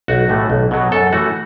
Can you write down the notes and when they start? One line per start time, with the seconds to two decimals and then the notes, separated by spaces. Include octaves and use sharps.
0.08 B1 F#4
0.29 A2 E3 A3
0.50 B1
0.71 B2 F#3
0.92 F#2 A4
1.12 E3 A3 F#4